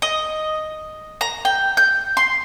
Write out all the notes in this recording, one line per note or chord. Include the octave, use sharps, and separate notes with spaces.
D#5
A#5
G5
G6
C6